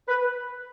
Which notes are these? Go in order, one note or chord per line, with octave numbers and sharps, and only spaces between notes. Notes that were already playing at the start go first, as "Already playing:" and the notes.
B4